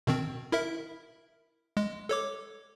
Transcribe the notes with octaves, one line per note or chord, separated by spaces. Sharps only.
B2 D#3 C4
E4 A#4 E5
G#3
A4 C#5 D6